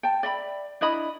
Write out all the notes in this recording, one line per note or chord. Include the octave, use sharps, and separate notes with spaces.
G5 A5
D5 E5 B5
D4 E4 D#5 B5